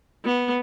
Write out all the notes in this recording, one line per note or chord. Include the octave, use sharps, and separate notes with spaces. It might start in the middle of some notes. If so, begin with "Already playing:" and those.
B3